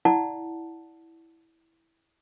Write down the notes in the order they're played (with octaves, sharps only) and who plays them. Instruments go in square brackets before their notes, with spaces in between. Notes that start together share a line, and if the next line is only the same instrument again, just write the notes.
[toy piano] E4 D5 F#5 A5